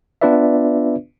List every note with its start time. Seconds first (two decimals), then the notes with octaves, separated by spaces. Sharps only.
0.21 B3 D4 F4 B4 D5 E5